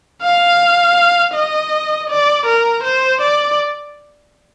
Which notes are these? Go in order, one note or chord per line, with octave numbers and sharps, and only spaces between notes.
F5
D#5
D5
A#4
C5
D5